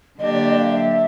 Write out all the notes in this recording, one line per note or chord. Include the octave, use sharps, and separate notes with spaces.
D3 F#3 A#3 D4 G4 D#5
D5
E5
D#5
F5
E5